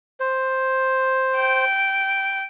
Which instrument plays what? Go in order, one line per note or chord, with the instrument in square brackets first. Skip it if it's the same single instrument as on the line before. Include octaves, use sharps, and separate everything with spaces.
[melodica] C5
[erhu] G5